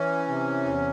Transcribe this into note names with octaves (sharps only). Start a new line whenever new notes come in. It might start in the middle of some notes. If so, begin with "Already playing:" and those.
Already playing: E3 C#4
C3
E2